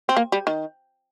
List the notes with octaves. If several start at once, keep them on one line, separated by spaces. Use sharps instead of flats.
C4
A#3
G3
D#3